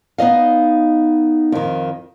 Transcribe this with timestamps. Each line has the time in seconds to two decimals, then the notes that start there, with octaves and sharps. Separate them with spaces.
0.18 B3 D#4 D#5 F5
1.52 F2 D#3